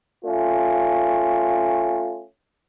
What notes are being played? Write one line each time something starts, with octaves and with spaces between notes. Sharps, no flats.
A3 C#4 F4